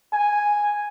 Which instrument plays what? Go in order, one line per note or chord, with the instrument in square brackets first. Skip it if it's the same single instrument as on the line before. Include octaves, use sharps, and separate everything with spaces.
[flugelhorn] G#5